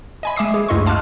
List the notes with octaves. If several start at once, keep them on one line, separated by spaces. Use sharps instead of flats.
D#5 G#5 B5
G#3 E5 D6 D#6 C7
G#4
D2 G2 E4 D#5 C6 C#6
F5 A5 C6 D6 F6 F#6